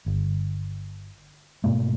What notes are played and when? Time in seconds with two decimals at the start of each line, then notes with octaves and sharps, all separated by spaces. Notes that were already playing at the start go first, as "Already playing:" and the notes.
0.06 G1
1.64 G#2 B2 A3 A#3